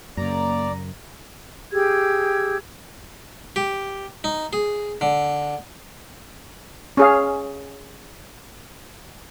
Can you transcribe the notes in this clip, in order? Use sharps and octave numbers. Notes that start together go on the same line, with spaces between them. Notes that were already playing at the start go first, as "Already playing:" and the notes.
F#2 C#3 A#3 D5 A#5
G4 G#4 E6 G#6
G4
D#4
G#4
D3
C#4 G#4 F5